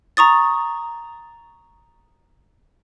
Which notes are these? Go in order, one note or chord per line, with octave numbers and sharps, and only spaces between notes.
A#5 C#6 D#6 A6